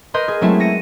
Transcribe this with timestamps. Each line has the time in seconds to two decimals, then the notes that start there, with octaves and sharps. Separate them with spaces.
0.14 A#4 B4 D#5 C6 G6
0.28 G#4
0.41 F#3 G#3 A3 C4 E4
0.60 A#6 C#7 D#7